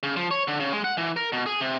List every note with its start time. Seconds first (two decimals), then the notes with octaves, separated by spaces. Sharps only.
0.03 C#3
0.16 F3
0.31 C#5
0.48 D3
0.60 C#3
0.73 G#3
0.84 F#5
0.97 E3
1.16 A#4
1.32 B2
1.46 G#4
1.61 C3